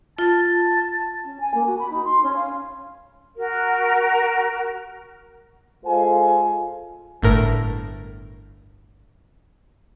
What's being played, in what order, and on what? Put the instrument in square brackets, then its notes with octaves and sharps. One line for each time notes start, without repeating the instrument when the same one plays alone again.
[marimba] F4 [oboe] A5
[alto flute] C#4
G#5
A#3
F#4
B5
D#4
C6
C#4
F5
[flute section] F#4 A#4
[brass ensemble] G#3 F4 A4 C5 F5 G#5
[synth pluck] G1 A2 A#4